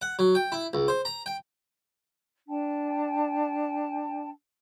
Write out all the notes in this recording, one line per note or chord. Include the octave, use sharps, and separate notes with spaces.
F#5
F#3
G5
E4
C#2
C5
A#5
G5
D4 G5 A5